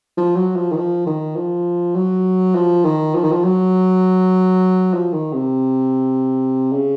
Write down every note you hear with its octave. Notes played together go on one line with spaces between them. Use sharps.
F3
F#3
F3
D#3
F3
D#3
F3
F#3
F3
D#3
F3
D#3
F3
F#3
F3
D#3
C3
C#3